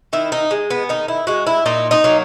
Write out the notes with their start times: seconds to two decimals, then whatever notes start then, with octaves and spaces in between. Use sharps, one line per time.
0.13 D#3 E4
0.32 D#4
0.51 G#3
0.70 B3
0.89 D#3 D#4
1.08 E4
1.27 G#3 F#4
1.47 E4
1.66 A#2 D#4
1.91 D#4
2.04 F#3 A#3